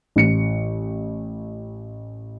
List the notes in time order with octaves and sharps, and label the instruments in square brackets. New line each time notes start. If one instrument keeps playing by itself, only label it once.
[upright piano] A1 C#7